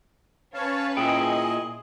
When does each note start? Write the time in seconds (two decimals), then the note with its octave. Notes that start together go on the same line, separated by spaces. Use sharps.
0.54 C#4 B4 C#5 F5 A5
0.97 A#2 E4 G#4 D#5 G5